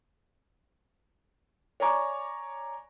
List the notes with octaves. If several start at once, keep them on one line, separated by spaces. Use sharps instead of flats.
C#5 D5 G#5 A#5 C#6 D6